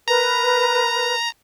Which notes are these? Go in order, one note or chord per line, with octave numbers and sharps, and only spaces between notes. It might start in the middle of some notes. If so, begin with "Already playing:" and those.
A#4 B4 A#5